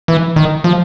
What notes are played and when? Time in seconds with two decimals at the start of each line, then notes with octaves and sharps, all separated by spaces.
0.08 E3
0.36 D#3
0.64 F3